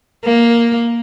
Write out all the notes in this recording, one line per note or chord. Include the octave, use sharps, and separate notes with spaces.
A#3